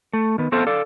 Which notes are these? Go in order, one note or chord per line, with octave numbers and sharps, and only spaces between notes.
A3
D#3 B3
A3 B3 C4 F4 A4 C5
A4 D5 F5